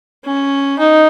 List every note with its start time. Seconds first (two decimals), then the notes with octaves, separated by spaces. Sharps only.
0.24 C#4
0.79 D#4